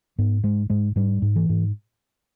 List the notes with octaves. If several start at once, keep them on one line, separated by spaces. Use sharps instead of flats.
G#2 B3
G#2 G#3
G#2 G#3
G#2 G3
G#2
E3
G#2